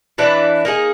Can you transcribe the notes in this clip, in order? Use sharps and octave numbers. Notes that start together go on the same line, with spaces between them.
E3 D4 E4 B4
A#3 D#4 G#4